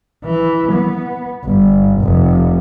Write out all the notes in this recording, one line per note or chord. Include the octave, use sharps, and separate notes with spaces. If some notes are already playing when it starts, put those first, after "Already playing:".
E3
B3
G1
F1